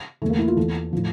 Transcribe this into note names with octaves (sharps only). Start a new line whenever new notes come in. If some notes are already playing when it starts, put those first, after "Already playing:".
E2 E3 A3
A#3
E4
F4
E2 E3 A4
A2 F3